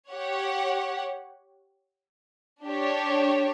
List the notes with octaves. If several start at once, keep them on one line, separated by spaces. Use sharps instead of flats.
G4 C#5 F#5
D4 G4 C#5